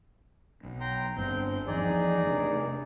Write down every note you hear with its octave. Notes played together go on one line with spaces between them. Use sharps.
B1
G5 A#5 C6
G1 G2 C4 G6
E2 F3 D#4 G#4 D5
C3 A3 D4